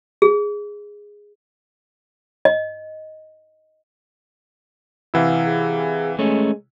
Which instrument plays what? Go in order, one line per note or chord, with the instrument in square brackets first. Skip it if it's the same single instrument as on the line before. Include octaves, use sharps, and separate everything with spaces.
[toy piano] G#4
D#5
[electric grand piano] C3 E3 E4 [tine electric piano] F5 F#5 E6
[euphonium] G#4
[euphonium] G#3 [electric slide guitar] A3 C#4